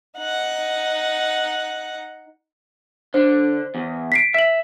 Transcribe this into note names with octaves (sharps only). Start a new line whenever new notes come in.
D#4 F#5
D3 D4 C5
E2
B6 C7 D7
E5 B6 F#7